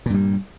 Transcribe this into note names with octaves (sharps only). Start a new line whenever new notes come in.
G2 A#2 G3